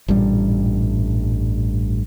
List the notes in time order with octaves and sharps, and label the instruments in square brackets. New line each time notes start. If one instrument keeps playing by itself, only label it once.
[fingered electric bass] A1 G2 A#2 G3